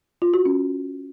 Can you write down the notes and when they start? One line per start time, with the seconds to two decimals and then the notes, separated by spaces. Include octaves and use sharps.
0.22 F4
0.34 F#4
0.45 C#4